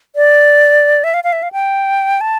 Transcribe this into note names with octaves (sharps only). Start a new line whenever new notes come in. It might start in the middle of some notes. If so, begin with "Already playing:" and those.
D5
E5
F5
F5
E5
F5
G5
A5